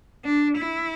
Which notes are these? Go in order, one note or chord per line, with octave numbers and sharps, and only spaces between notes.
D4
E4